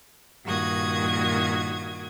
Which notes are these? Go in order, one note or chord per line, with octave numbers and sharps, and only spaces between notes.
G2 A#2 D#3 F#4 D#6 G#6